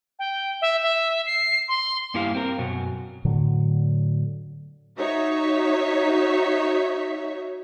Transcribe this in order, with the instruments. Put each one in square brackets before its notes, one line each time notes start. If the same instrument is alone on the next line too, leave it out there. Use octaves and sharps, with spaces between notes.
[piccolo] G5
E5
E5
C7
C6
[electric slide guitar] G2 A#3 E4 G4 F5
C4 A#4
F#2 B2 F#3
[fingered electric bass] A2 D3 F#3
[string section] D#4 F#4 C#5 E5